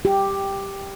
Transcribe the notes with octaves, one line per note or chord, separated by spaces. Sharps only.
G4